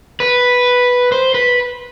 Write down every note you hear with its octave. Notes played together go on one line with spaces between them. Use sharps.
B4
C5
B4